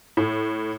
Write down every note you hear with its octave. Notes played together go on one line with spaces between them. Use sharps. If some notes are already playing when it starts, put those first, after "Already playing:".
A2